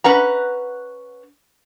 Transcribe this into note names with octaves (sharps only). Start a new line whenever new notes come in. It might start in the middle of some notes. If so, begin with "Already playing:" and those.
C#4 B4 F#5 A#5